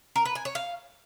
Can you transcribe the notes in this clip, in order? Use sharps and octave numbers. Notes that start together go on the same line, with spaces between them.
A#4
B4
G#5
C#5
F5